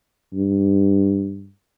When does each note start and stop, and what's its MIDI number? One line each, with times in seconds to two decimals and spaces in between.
0.34 1.50 43